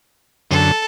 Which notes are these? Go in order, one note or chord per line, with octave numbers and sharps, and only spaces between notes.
F#2 D3 A4